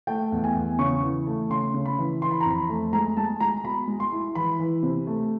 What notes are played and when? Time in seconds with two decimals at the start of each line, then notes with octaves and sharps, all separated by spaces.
0.07 A3 G5
0.32 E2
0.44 G#5
0.55 E2
0.79 C#3 C#6
1.03 E3
1.27 A3
1.50 C#3 C6
1.74 C#3
1.86 B5
1.98 E3
2.22 E3 C6
2.31 B5
2.41 A#5
2.46 F2
2.51 B5
2.69 A3
2.93 G#3 A#5
3.17 G#3 A5
3.40 G#3 A#5
3.64 B2 B5
3.88 G#3
4.00 C6
4.12 E4
4.35 E3 B5
4.59 E3
4.83 C3
5.07 A3